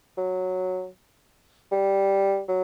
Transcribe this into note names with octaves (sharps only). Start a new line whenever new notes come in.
F#3
G3
F#3